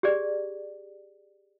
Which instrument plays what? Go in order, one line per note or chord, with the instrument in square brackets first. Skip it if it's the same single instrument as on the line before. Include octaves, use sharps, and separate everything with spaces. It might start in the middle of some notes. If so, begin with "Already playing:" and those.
[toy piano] G4 G#4 D5